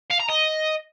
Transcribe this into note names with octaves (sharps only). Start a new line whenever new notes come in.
F5
A#5
D#5